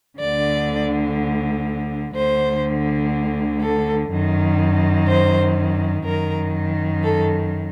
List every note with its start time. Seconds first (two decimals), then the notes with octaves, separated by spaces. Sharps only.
0.19 D2 D3 D5
2.15 D2 D3 C5
3.61 A4
4.10 F#2 D#3
5.08 C5
6.05 F#2 D#3 A#4
7.03 A4